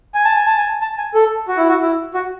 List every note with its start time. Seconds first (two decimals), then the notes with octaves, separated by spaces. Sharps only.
0.15 G#5
0.25 A5
0.35 G#5
0.47 A5
0.57 G#5
0.82 A5
0.98 G#5
1.14 A4
1.48 F#4
1.58 E4
1.69 F#4
1.82 E4
2.14 F#4